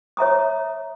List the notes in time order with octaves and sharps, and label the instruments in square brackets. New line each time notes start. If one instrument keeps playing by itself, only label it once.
[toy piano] C#5 E5 A#5 D#6